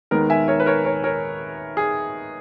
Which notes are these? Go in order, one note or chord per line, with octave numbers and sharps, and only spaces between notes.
D#2 D#3 G#3 B3 A#4
E5 G#5
A#4 C#5
B4
A#4 C#5
A#4 C#5
A#4 C#5
G#4